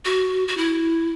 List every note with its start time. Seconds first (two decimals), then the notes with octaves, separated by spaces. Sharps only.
0.05 F#4
0.48 F#4
0.57 E4